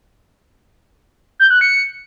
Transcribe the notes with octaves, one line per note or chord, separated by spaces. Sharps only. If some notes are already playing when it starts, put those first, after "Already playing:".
G6
F#6
C#7